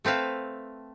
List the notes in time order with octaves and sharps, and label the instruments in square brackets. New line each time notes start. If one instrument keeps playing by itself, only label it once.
[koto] A3 C4 B4 F5